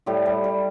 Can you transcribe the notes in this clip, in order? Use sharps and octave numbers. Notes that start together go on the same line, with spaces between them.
A2 G3 G4
G3
G3